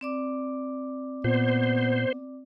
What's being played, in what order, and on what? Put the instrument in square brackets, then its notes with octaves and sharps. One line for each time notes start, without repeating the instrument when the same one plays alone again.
[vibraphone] C4 D5 D6
[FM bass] A#2 [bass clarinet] B3 [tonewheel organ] C5